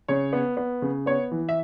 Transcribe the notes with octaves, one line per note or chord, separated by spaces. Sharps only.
C#3 C#5
B3
B3
C#3
B3 C#5
E3
E5